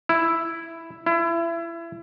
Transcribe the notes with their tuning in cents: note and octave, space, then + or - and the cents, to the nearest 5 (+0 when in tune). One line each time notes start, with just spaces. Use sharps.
E4 +5
E4 +30